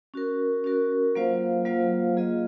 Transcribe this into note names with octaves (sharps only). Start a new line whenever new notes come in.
C#4 F#4 A#4
C#4 F#4 A#4
F#3 A#3 F4 C5 F5
F#3 A#3 F4 C5 F5
A#3 F4 G#4 D#5